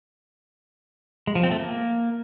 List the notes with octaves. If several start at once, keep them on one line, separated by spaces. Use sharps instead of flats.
G#3
F3
C4
A3
A#3